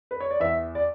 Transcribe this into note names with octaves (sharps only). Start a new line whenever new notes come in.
B4
C#5
D5
E2 E5
D5